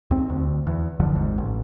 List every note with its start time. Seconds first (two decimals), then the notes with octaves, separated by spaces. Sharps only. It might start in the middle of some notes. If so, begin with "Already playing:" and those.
0.11 D#2 C4
0.30 D2
0.67 E2
1.00 F#1 D#2 D3 F3
1.15 G#1 G#2
1.38 A1